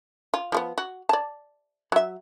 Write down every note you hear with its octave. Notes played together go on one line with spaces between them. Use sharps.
F4
F3 A3 B3
F#4
D5 A5
F#3 E5